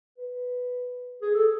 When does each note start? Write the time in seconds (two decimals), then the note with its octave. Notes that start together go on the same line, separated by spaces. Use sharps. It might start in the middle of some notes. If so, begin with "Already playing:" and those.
0.18 B4
1.22 G#4
1.34 A4